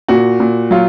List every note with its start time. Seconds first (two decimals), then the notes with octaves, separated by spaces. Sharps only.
0.08 A#2 F#4
0.40 A#2
0.71 F#3 F4